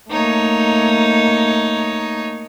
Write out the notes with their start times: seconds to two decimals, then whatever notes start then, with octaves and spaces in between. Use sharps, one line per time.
0.10 A3 A#3 D#4 C#5